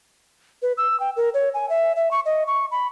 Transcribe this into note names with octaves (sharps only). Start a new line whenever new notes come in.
B4
E6
G5
A#4
C#5
G#5
E5
E5
C#6
D#5
C#6
B5